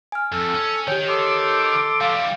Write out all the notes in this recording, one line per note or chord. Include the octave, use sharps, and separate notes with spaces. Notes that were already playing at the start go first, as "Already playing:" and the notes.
G#5 F6
F2 A4
C#4
D#3 G4 C#5 G5
A4 C6 D6
E3 G3 F5